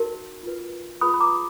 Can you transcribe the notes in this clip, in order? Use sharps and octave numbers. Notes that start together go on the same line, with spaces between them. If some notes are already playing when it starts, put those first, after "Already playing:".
Already playing: D#4 F#4 A#4
F4 B4
F4 G#4 B4 B5 D#6
B5
A#5 D6